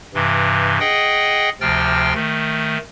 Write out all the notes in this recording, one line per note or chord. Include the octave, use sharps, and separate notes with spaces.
G2 C3 E3
G#4 D#5 F#5 G5
D2 C3 F3 G5 F6 A6
D#3 A3